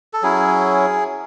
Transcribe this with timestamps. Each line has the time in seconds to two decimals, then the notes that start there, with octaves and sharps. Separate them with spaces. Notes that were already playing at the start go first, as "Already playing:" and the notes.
0.13 A4
0.23 F#3 C#4 E4 G#4